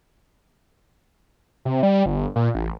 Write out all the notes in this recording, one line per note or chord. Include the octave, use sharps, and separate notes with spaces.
C3
G3
G1
A#2
A1